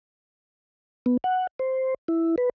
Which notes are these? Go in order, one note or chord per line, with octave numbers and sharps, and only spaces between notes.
B3
F#5
C5
E4
B4